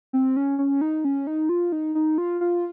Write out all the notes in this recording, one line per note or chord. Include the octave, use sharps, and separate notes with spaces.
C4
C#4
C#4
D#4
C#4
D#4
F4
D#4
D#4
F4
F4